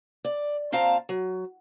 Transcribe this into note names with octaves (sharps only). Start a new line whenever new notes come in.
D5
A#2 C4 F5 A5 A#5
F#3